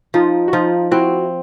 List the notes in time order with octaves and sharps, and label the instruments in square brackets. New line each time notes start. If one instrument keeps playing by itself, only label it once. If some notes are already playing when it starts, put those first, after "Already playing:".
[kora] F3 [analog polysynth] D#4 F4
[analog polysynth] F#4
[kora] F3 [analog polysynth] D#4 F4
[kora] C4 [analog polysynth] E4 F#4